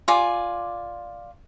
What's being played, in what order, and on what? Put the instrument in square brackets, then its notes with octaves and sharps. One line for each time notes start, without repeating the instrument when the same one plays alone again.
[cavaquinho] F4 D5 G#5